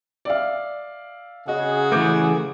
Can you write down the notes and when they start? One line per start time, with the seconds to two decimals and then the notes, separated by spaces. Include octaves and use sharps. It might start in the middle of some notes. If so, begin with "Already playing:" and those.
0.25 D5 E5 F5
1.48 C#3 F#4 G#4 D#5
1.91 E3 A3 B4 D6 G6